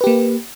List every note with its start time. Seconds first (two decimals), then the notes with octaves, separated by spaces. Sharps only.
0.01 B4
0.04 G4
0.07 A#3